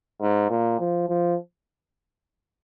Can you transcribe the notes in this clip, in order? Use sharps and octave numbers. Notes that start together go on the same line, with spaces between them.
G#2
A#2
F3
F3